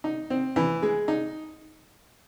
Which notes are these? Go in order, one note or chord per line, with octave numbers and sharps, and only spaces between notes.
D#4
C4
E3
G#3
D#4